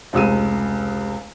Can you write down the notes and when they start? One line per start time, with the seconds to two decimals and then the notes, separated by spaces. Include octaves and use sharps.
0.13 F1 C#2 E6 D#7